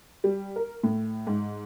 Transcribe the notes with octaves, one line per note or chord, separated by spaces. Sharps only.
G3
A#4
A2
G#2